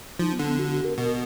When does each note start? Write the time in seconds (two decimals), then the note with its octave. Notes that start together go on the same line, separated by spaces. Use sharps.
0.19 F3 D#4
0.32 B3
0.39 D3
0.46 B3
0.59 F#4
0.72 F#4
0.85 A#4
0.97 B2 A#4